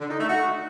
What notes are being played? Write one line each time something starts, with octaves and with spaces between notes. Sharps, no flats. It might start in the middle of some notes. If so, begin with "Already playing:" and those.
D3
D#4
A3
F#4